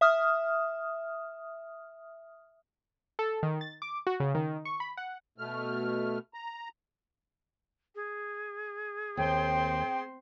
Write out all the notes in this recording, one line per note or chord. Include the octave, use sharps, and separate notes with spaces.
E5 D#6 F6
A4
D#3
A6
D6
F#4
C#3
D#3
C#6
B5
F#5
B2 A3 F6
A#5
G#4
D#2 C4 G5 C6